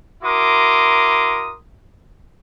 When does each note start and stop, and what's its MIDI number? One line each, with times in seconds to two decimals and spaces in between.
0.23 1.56 64
0.23 1.56 66
0.23 1.56 70
0.23 1.56 84
0.23 1.56 86
0.23 1.56 87